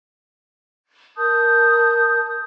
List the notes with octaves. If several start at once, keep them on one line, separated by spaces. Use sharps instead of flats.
A#4 A5 D#6 G6